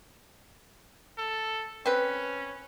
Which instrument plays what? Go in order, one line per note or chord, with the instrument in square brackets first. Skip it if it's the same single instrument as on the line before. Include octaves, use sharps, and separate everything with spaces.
[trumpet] A4
[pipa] C4 B4 [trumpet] C#4